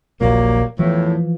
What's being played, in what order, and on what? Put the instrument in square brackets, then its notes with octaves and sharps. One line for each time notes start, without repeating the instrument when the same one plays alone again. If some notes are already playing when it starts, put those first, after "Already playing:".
[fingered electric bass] D#1 A#1 A#2 [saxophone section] F#3 G3 A#3
[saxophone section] E2 A2 [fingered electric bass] E3 F3